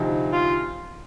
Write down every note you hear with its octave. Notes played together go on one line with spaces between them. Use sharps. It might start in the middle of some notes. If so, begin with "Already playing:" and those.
Already playing: D2 C3 F3 C4 D#4
F4